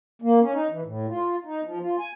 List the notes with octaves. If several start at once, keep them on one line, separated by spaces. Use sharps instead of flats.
A#3
C#4
D#4
E3
A2
F4
D#4
F3
F4
G#5